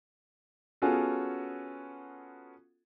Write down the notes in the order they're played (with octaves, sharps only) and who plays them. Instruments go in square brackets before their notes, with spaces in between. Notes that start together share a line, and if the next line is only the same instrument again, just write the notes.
[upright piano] B3 C#4 F4 F#4 G#4 A4